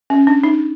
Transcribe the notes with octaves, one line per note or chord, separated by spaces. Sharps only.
C#4
D4
D#4